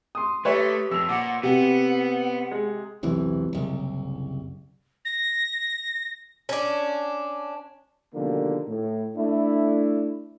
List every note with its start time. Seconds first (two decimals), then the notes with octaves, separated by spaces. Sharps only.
0.15 C6 D#6
0.45 A3 G4 B4 C#5 E5
0.91 F2 E6 F7
1.09 A#2 F#5 D6
1.43 C3 B3 C4 F#5
2.51 G#3
3.03 E1 B1 C3 E3
3.53 F#1 C2
5.05 A#6
6.49 C#4 D4
8.15 B2 D3 D#3 F3 G3 A#3
8.67 A2
9.16 A3 D4 E4